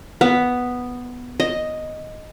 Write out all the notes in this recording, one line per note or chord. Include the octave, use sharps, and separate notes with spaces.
B3
D#5